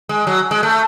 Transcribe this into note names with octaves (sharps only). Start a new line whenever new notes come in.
G#3
F#3
G#3
A3